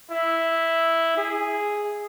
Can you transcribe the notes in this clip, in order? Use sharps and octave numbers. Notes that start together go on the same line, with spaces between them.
E4
G#4